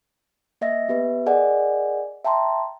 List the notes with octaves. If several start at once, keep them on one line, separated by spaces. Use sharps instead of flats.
A#3 D#5 E5 A#6
B3 G4 B4 E5
G#4 A#4 D5 D#5 F#5 G#5
E5 G5 A5 A#5 C6